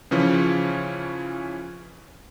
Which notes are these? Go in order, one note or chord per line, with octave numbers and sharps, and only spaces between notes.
C#3 E3 F3 C#4